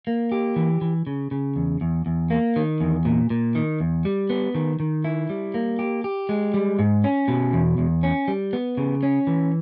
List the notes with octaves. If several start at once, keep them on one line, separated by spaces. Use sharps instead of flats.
A#3
G4
E3
E3
C#3
C#3
E2
E2
E2
A#3
D#3
E2
A#2
A#2
D#3
E2
G3
B3
D#3
D#3
E4
G3
A#3
G4
G4
G#3
G3
G#2
C#4
B2
E2
E2
C#4
G3
B3
C#3
C#4
E3